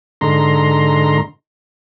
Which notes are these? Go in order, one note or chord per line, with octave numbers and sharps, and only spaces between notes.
G#2 D3 A#5 C6